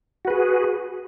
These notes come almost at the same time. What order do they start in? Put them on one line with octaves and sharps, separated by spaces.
F#4 B4 G#4